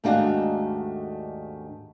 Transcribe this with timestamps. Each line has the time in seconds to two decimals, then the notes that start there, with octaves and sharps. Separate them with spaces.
0.04 D#2 G#2 A3 D4 F#4 F5